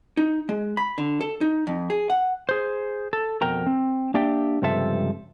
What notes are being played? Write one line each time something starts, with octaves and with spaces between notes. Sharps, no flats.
D#4
G#3
B5
D3
A4
D#4
F2
G#4
F#5
G#4 C5
A4
F2 B2 A#4 G5 A#5
C4
A#3 D4 G4 D5 E5 G5
C#2 G2 C3 F3 A4 E5